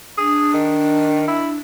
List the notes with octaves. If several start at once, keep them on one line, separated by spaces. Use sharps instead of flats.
D4 G#4
D#3
E4